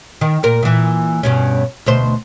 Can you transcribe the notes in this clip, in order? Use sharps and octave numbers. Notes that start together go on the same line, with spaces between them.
D#3
A#2 A#4
A#2 E3
G2 B2 C#4
D2 B2 C5